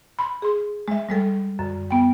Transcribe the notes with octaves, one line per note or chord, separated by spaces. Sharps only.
B5 C6
G#4 C6
G#3 E5
G3 G#3 A4
F#2 D3
B3 G5